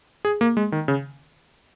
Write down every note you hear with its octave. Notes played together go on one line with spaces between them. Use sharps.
G#4
A#3
G#3
D#3
C#3